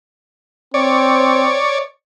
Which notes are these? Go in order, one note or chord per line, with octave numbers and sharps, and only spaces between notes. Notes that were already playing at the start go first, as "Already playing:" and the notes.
C4 C#5 D5